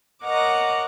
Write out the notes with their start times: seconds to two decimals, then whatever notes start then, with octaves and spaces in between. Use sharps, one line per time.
0.23 A#4 C#5 D#5 F#5 A#5 D6